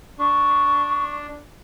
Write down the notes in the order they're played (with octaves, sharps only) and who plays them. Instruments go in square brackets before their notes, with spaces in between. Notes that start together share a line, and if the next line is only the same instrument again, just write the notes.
[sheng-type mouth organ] D4 [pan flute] C#6